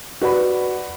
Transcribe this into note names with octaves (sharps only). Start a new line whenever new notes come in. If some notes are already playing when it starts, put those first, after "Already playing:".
F#4 B4 D5 B5